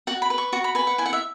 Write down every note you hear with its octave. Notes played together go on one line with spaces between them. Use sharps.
F#4 F#5
B5
B4
C#6
F#4 C#6
B5
B4 G#5
F#5
E4 G#5
F#5
E5